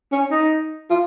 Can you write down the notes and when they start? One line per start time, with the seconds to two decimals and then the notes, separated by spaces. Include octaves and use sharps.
0.12 C#4
0.31 D#4
0.90 F4